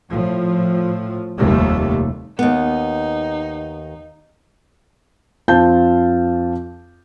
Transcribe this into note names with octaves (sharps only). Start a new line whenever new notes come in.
A2 F3
F1 D#2 C3 G3 A3
D#2 B3 D#4
F2 C4 F4 F5 A5 G6